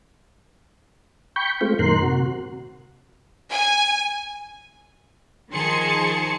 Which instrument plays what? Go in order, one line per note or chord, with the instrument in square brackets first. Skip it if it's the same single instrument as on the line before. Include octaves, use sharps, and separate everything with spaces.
[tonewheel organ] G5 B5 C#6 G6
G#3 A3 C4 F4
F#2 A#2 D#3 A#4 C6 F#6
C3 F#4
[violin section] G#5
[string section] D#3 F3 G#4 A5 C6 C#7